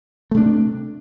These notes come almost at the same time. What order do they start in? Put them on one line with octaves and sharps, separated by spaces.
A3 C3 D4